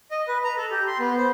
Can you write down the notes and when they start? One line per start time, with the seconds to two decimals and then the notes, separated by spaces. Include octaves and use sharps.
0.11 D#5
0.28 B4
0.44 A#5
0.58 A4
0.71 G4
0.87 C6
0.99 B3
1.18 C5